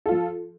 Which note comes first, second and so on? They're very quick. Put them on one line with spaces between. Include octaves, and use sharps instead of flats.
A4 F4 F3